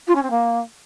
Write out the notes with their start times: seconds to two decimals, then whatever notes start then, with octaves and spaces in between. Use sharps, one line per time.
0.07 F4
0.15 C#4
0.22 C4
0.30 A#3